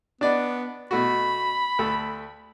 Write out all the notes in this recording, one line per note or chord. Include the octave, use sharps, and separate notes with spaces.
B3 D4 D5 D#5
B2 A3 F#4 B5
D2 A4